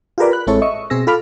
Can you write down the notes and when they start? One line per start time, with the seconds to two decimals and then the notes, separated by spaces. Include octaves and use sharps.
0.18 F4 G4 G#4 A#4 B4 D5
0.31 B5 F#6
0.47 A1 G#3 C4 E4 A4 C#5
0.62 D#5 E5 C#6
0.90 B2 C4 G#4 E6 A#6
1.07 F4 A4 F5 B5 D6 F6